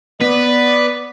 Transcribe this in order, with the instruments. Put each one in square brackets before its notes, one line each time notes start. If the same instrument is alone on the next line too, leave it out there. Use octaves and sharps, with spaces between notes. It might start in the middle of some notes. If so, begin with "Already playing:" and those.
[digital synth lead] B3 [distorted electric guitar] B4 [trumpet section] D5